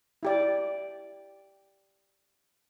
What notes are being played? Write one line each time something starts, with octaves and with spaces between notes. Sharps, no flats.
E4 G4 D5